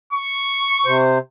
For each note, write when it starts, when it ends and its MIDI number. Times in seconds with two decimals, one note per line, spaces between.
0.13 1.03 85
0.86 1.18 48
0.86 1.18 72